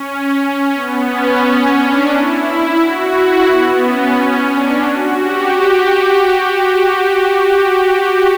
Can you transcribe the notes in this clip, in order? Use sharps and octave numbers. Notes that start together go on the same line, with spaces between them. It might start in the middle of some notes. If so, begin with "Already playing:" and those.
Already playing: C#4
B3
C#4
D4
E4
F#4
E4
B3
C#4
D4
F#4
G4